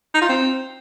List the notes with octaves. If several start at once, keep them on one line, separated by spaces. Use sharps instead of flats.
D#4
F4
C4